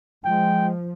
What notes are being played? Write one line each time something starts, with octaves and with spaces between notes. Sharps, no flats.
F3 G#3 G5